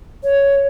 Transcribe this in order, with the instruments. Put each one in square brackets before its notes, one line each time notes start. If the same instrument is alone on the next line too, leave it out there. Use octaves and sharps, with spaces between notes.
[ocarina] C#5